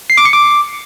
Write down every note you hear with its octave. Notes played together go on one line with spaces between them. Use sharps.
C7
D6
C#7
D6